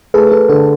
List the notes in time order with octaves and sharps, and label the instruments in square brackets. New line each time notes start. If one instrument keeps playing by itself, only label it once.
[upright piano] A3 [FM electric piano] G#4 B4
[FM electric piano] A4
[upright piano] D3 [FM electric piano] A4